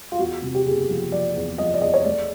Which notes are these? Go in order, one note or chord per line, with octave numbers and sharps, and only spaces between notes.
F4
E2 F#4
C3
G4
F#1 G#4
F3
F3 D5
E2
F3 D#5
D5
E2 D#5
C#5
A3 D5